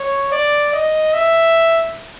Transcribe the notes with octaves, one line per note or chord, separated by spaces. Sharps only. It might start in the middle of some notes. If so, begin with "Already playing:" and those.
Already playing: C#5
D5
D#5
E5